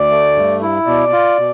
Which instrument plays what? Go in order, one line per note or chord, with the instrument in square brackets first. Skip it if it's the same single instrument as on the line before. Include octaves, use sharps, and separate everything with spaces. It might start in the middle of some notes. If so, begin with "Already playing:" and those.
Already playing: [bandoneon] D2 [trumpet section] D5
[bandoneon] A3
G2
E4
[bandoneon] B2 [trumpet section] D5
[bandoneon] F4
B2